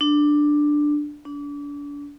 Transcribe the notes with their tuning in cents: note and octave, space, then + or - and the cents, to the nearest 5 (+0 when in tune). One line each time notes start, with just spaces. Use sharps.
D4 +5
D4 -35